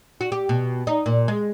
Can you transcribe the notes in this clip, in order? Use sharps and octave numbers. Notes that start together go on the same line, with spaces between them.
F#4
G4
B2
D#4
A#2
G#3